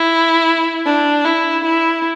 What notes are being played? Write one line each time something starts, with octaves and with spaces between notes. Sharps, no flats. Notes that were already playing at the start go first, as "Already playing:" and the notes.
Already playing: E4
D4
E4
E4